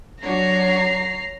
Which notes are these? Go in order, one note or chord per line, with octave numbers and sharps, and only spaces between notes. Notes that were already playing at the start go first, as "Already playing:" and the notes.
F#3 D4 F#4 C#5 A#5 C7